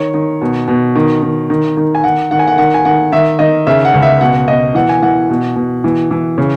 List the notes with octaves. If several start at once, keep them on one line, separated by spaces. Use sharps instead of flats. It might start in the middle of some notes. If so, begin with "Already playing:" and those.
Already playing: D#3 C#5
D#3
B2
B2
D#3
D#3
D#3
D#3
G#5
D#3 F#5
D#3 F#5
G#5
F#5
D#3 F#5
G#5
D#3 F#5
D#3 E5
D#3 D#5
C#3 E5
F#5
C#2
E5
B2 F#5
B2 D#5
E3 F#5
G#5
E3 F#5
B2
B2
E3
E3
C#3